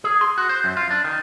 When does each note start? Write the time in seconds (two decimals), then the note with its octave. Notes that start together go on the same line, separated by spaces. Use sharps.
0.04 G#4
0.21 C6
0.38 F#4
0.49 C5
0.64 F#2
0.77 F4
0.90 D4
1.04 D#3